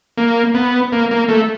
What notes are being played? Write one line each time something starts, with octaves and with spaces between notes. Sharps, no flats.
A#3
B3
A#3
A#3
A3